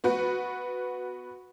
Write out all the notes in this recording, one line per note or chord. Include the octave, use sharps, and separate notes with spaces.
B3 F#4 B4